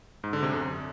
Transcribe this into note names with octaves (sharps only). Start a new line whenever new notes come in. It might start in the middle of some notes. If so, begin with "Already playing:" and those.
G#2
D3
C3
F#2